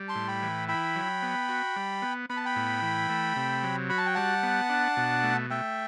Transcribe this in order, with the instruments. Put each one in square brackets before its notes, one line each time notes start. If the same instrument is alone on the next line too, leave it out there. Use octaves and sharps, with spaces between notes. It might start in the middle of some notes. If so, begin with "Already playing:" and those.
Already playing: [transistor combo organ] G3
[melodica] A5 C6
[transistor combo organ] A2
[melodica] G5 B5
[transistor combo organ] E3
[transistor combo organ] E4 [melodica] G5 B5
[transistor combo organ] F#3
B3
F#4
G3
B3
[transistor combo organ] B3 [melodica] B5
[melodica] A5
G5 B5
[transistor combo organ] A2
E3
A3
C3
F#3
[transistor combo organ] F#4 [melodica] B5
[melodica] A5
G5
[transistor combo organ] G3 [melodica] F#5 A5
[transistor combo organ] B3
D4
B2
A3
[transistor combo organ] A3 [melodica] E5 G5